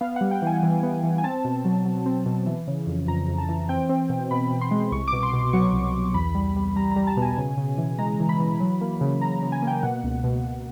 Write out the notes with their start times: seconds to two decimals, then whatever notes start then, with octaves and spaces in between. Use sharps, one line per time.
0.01 B3 F5
0.16 G3 F#5
0.31 G5
0.42 E3 G#5
0.63 E3
0.83 B3
1.03 E3
1.18 G#5
1.24 C4 A5
1.44 B2
1.65 F#3
1.86 F#3
2.06 C4
2.26 B2
2.46 E3
2.68 C#3
2.87 F2
3.08 F2 A#5
3.28 F2
3.38 A5
3.49 E3
3.69 C4 G5
3.89 C4
4.10 B2
4.31 B2 B5
4.51 B2
4.61 C6
4.71 G#3
4.91 C2 C#6
5.08 D6
5.13 B2
5.23 C6
5.33 B2 C6
5.53 F#3 C#6
5.73 C2
5.94 C2
6.14 E2 B5
6.35 G3
6.56 G3
6.76 G3 A#5
6.92 G3 A#5
7.07 A5
7.17 B2
7.22 G#5
7.38 C#3
7.57 C#3
7.78 E3
7.99 G#3 A#5
8.20 E3
8.29 B5
8.40 E3
8.60 F#3
8.81 A#3
9.01 C#3
9.21 C#3 A#5
9.42 C#3
9.52 G#5
9.62 A#3 G5
9.83 B2 F#5
10.04 C#2
10.24 B2
10.44 B2